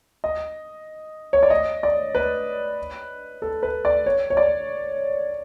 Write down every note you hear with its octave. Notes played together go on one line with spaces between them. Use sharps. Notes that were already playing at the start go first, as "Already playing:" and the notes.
D#5
C#5
D5
D#5
D5
B4
A4
B4
D5
C#5
C#5
D5